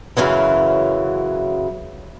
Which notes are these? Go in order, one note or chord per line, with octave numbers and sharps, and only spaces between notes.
F#2 C#3 E3 F#3